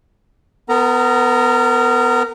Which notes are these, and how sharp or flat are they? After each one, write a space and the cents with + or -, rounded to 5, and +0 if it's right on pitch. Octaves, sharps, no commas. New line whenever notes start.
B3 +15 A#4 -30 A#5 +0